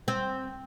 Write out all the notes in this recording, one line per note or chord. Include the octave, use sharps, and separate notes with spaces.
C4